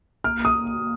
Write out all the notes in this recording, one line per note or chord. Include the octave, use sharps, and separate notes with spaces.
A#3 F6
D#6